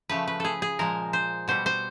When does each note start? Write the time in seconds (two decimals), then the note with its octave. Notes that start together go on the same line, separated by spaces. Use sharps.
0.09 C#3 F3 A3 B4
0.27 B4
0.40 G#4 A4
0.62 G#4
0.79 A#2 F3 G#3 A#4
1.13 C5
1.48 B2 G3 C5
1.66 C5